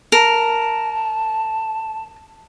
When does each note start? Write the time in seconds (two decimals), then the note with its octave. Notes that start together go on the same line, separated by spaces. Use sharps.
0.12 A#4 A5